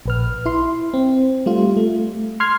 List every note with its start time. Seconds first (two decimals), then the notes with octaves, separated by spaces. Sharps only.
0.06 A#1 B4 F6
0.46 E4 C6
0.94 C4
1.46 G3 A3 F4
1.77 A3
2.40 C6 F6 G#6 C7